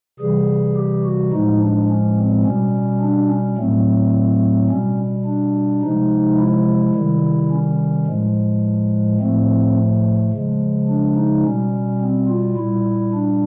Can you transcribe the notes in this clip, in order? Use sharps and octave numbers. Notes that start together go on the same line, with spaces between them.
C3 E3 G3 G#4
G4
F#4
A2 F3 G#3 D#4
D4
C#4
C4
B2 G3 C#4
D4
C#4
A2 F#3 A3 C4
B2 G3 C#4
D4
C3 F3 G#3 D#4
E4
C3 D#3 G3
C#4
A2 F3 G#3
A2 F3 A3 C4
C#3 F3 G#3
D4
D#4
B2 G3 C#4
C4
F4
A#2 G3 E4
D4